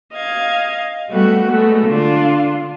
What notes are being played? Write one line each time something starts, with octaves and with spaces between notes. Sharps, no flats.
D#5 F5 G#6
G3 A3 B3 F#4
G#3 A3 B3
D3 D4 F4